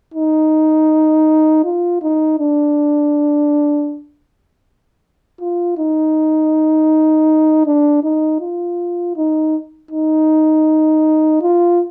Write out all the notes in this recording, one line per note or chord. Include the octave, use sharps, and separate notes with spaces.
D#4
F4
D#4
D4
F4
D#4
D4
D#4
F4
D#4
D#4
F4